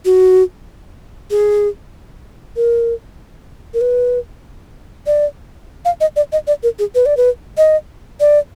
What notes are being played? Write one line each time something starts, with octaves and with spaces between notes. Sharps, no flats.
F#4
G#4
A#4
A#4
B4
D5
F5
D#5
D5
D#5
D5
A#4
G#4
B4
D5
B4
D#5
D5